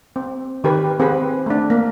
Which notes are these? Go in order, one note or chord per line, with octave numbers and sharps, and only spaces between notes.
C4
D#3 G4 A#4 B4
C4 G#4 A#4 B4
A3 D4
A#3